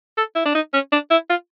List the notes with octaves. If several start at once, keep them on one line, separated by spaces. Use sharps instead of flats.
A4
E4
D4
D#4
C#4
D4
E4
F4